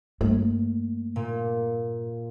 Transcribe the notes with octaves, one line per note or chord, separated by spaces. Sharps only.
G2 A3 A#3
A#2